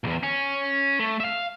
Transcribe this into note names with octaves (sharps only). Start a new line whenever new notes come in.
B1 E2
C#4
A3
E5 F5